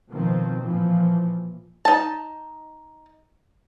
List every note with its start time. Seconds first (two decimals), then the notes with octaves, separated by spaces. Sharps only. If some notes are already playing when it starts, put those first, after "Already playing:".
0.13 B2 D#3 F3 C4
0.66 A#2 E3 F3
1.85 D#4 A5